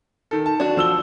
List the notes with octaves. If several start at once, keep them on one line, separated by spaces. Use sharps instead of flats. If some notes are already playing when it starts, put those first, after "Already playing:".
D#3 A4
A5
D4 F#4
F3 E6 G7